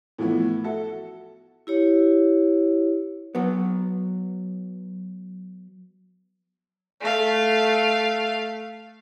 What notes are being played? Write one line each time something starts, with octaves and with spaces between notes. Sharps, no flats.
A2 E3 F3 A3 B3
F#4 A4 E5
E4 G4 C#5
F#3 B3
A3 F5